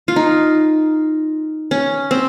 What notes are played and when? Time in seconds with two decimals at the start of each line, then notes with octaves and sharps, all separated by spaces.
0.08 F4
0.16 D#4
1.71 C#4
2.11 C4